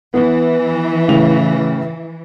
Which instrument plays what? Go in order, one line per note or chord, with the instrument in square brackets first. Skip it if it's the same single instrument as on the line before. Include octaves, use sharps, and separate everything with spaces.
[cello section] E3 [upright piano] B3
[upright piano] A2 C#3 F7